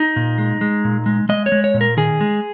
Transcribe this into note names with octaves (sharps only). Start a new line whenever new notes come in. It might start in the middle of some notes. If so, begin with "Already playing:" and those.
Already playing: D#4
A#2
G#3
G#3
A#2
G#3
G#3 D#5
C#5
G#3
C#5
A#2
A#4
D#3 G#4
G#3